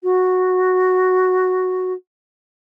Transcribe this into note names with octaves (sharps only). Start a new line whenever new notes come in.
F#4